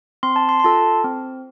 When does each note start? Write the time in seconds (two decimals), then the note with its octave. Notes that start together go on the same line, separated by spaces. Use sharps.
0.23 C4 C6
0.36 A5
0.49 C6
0.60 C6
0.64 F4 A4 A5
1.04 C4